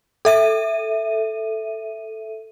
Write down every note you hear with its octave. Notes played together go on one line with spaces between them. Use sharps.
A4 E5 D#7